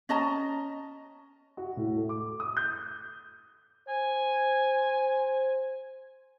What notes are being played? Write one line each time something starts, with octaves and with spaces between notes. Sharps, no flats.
C#4 D#5 A5 A#5
F#4
A2
A3
D6
D#6
G6
C5 G#5